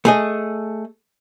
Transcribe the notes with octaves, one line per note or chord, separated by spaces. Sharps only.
A3 G#4 D#5